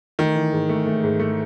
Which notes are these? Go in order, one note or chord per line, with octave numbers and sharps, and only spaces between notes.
D#3 A3
E3
G#2
A3
A3
G#2
A3